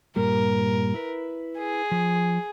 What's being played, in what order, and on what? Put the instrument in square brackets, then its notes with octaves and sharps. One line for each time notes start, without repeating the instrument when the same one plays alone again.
[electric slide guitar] G2 A#2 G3 [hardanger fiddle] A#4
[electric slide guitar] E4 B4
[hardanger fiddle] G#4
[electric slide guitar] F3